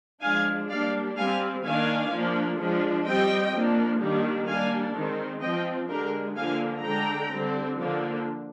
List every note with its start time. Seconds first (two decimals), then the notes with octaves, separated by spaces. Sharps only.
0.22 F3 G#3 D4 F5 G#5
0.69 G3 A#3 D4 D5 F5
1.16 G3 C4 F5 G#5
1.63 D#3 A#3 D4 F5 G#5
2.11 F3 A#3 D4
2.58 F3 G#3 D4
3.05 G3 C4 D#5 G5
3.53 F3 A#3 D4
4.00 D#3 G3 A#3 D4
4.47 G3 A#3 D4 F5 G#5
4.95 D#3 G#3 C4
5.42 F3 C4 D#5 G5
5.89 D3 G#3 D4 G4 A#4
6.37 D3 F3 A#3 D4 F5 G#5
6.84 D3 G#3 D4 G5 A#5
7.32 D3 G3 C4
7.79 D3 F3 A#3 D4